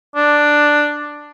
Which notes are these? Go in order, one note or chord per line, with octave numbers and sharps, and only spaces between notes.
D4